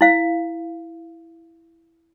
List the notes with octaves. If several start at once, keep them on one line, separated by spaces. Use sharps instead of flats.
E4 F5